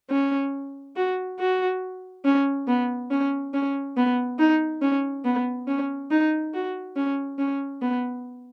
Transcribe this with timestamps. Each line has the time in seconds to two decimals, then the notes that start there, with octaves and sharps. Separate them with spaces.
0.10 C#4
0.96 F#4
1.39 F#4
2.25 C#4
2.68 B3
3.11 C#4
3.54 C#4
3.97 B3
4.39 D#4
4.82 C#4
5.25 B3
5.68 C#4
6.11 D#4
6.54 F#4
6.96 C#4
7.39 C#4
7.82 B3